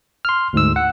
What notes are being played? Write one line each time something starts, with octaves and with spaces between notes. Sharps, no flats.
C6 F6
D2 G#2 E6
F#5